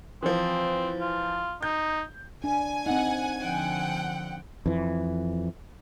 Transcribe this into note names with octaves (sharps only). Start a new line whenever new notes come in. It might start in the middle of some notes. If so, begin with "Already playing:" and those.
E3 F3 C4
F4
D#4 G6
D4 G#5
C4 D#4 F#5
D3 F3 F#5 G5
F2 E3